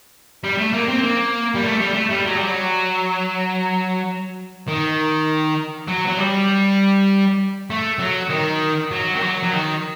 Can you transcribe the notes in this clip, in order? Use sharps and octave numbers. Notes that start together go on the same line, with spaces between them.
G3
A3
A#3
C4
A#3
G3
A3
G3
A3
G3
F#3
G3
F#3
D#3
F#3
F#3
G3
A3
F#3
D#3
F#3
D#3
F#3
F#3
D#3